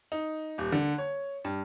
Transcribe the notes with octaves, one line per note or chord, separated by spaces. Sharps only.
D#4
D#1
D3
C#5
G2